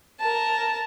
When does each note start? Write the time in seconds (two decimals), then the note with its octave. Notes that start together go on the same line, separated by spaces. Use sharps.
0.20 A#4 A5